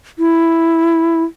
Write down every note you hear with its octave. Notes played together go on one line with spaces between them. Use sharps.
E4